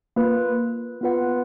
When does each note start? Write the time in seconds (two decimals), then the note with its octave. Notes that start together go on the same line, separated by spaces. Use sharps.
0.16 A#3 F4 B4
1.01 B3 F4 B4 F#5